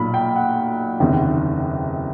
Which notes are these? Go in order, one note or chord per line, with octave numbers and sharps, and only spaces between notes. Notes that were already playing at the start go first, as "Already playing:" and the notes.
Already playing: B1 A#2 B5
G5
F#5
F#1 E2 C3 D#3